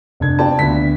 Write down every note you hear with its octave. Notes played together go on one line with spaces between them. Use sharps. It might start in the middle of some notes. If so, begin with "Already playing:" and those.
F1 D4 G#6
C4 F4 D5 G5 A5
D2 B3 D4 B6